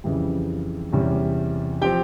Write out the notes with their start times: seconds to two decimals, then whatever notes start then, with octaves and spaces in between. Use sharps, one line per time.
0.04 F2 C#3 E3 G3
0.92 E2 C3 G3 C#4
1.81 F3 C4 G4 G5